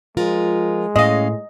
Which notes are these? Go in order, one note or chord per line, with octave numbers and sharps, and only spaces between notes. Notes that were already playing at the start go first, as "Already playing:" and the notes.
F3 G#3 F4 A#4
A2 C#4 D#5 F5